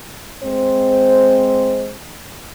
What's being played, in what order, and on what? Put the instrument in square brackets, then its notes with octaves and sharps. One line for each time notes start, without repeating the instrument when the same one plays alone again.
[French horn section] G#3 C4 C5